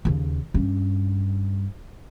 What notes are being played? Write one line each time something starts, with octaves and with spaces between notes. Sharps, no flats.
D#2 C#3
G2 C#4